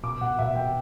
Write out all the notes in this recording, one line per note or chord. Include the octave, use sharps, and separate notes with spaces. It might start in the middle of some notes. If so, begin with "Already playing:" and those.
B2 D6
B2 F#5
B2 E5
B2 G5